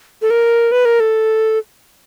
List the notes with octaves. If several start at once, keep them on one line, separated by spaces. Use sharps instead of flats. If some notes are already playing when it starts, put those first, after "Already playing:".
A4
A#4
B4
A#4
A4